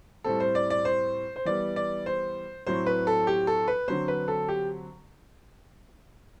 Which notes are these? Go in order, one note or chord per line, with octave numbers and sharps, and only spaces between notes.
A2 G3 C4 A4
C5
D5
D5
C5
C5
E3 G3 B3 D5
D5
C5
A2 F#3 C4 C5
B4
A4
G4
A4
B4
D3 F#3 C4 C5
B4
A4
G4